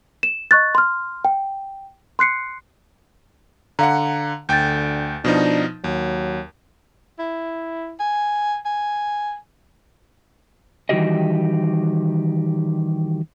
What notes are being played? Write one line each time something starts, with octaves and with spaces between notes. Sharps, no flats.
E7
D#5 C#6 F#6 A6
C6 F6
G5
C6 F#6 C7 C#7
D3 F5 F#5 A#5
D2 D3 G5 G6 A6
B2 F3 D4 D#4
D#2 F#3
E4
G#5
G#5
D#3 E3 G3 F#4 G4 D#5